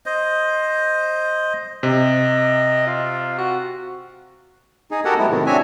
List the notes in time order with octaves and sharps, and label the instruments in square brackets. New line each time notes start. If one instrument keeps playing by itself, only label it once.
[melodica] C5 D#5
[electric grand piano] C3 [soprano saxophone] D#5
[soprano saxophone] F4
F#4
[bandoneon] D#4 G#4
F#4 G4 A4 A#4 F#5
F#3 G#3 A3 B3 E4
A2 C3 D#3
C4 D4 F#4 C#5 E5 G#5